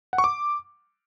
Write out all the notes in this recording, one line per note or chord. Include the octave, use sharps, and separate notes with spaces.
F#5
C#6
D6